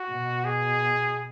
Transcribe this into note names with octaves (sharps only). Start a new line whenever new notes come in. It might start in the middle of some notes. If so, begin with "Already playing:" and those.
Already playing: F#4
B2
G#4